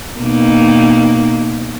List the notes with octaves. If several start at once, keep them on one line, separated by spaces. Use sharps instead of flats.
B2 A#3 D#4